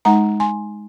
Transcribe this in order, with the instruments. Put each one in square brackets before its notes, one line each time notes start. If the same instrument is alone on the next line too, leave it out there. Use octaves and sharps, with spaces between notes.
[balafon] G#3 D#4 F#5 A#5
G#5 C6